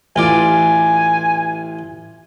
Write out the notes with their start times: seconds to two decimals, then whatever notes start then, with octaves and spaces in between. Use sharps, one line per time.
0.16 A1 F4 D5 G#5